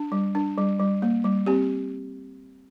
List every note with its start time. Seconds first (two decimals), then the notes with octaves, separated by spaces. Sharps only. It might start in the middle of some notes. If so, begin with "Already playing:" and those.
Already playing: D4
0.12 G3
0.35 D4
0.58 G3
0.80 G3
1.02 A#3
1.24 G3
1.46 C4 G4